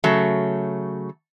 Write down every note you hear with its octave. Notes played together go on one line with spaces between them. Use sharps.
C#3 F#3 A3